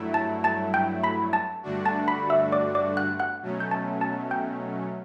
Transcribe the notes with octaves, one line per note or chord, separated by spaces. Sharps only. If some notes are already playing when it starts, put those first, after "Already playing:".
Already playing: G2 F#3 A3 E4
A5 A6
A5 A6
G5 G6
B5 B6
A5 A6
G2 D3 A3 D4 F#4
A5 A6
B5 B6
E5 E6
D5 D6
D5 D6
F#5 F#6
F#5 F#6
B2 F#3 A3 C#4
G6
A5 A6
A5 A6
G5 G6